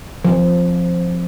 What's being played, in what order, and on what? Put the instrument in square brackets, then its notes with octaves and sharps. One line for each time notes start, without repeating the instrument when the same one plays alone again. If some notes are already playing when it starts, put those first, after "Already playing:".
[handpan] F3